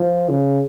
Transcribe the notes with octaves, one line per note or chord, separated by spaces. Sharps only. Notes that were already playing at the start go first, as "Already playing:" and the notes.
Already playing: F3
C#3